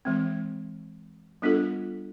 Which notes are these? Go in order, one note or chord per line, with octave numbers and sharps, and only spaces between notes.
E3 G#3 C4
G3 B3 D4 F4 A4